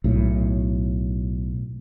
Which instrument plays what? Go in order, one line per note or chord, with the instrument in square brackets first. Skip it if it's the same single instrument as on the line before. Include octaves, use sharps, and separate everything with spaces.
[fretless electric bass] B1 A2